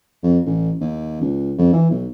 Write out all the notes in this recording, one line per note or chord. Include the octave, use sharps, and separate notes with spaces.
F2
A1
D#2
C#2
F2
E3
B1